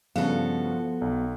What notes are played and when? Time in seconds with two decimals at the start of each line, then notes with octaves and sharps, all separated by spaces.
0.16 G2 C#3 F3 B3 F#4 A4 F5
1.02 B1